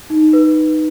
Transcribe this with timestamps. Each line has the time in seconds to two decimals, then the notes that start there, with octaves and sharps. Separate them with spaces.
0.10 D#4
0.33 B4